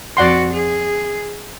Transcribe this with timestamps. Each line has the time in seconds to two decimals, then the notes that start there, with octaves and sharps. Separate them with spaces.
0.17 F2 F#4 D5 F#5 C6
0.53 G#4